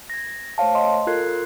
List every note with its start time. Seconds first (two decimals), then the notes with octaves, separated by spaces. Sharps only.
0.10 G#6 A#6
0.58 A3 C5 C#5 F5 A5
0.75 D#5 C6
1.07 F4 A4 A#4 F#6 G#6 C7